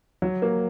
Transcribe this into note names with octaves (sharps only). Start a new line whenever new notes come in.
F#3
A#3